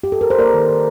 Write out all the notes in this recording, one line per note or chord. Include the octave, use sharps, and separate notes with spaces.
G4
A4
A#4
C5
A#3 A#4 D5
D#3
D#3